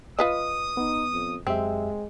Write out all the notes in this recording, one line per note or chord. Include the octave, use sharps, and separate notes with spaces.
F4 B4 D#5 D#6
B3 D#4
F2
F#2 G#3 C4 G4 E5